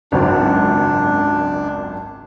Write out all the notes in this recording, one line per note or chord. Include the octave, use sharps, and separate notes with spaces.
G#1 C#2 F#2 D4